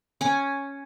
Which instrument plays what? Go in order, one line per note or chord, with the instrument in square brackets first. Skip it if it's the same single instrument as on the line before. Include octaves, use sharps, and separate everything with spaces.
[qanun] C#4 G#5